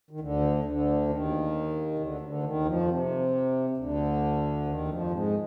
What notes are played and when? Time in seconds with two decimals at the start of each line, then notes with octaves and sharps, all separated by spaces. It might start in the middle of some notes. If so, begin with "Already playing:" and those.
0.11 D#3
0.20 D2 D3
0.64 D2 D3
1.09 D#2 D#3
1.94 C3
1.99 D2 D3
2.21 D2 D3
2.43 D#2 D#3
2.65 F2 F3
2.88 C3
3.70 C3
3.77 D2 D3
4.66 D#2 D#3
4.88 F2 F3
5.11 G#2 G#3